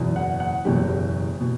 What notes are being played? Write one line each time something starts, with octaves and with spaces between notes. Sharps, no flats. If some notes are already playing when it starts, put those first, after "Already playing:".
Already playing: F#1 E2 B2
F#5
F#5
F#1 E2 B2 G4
B2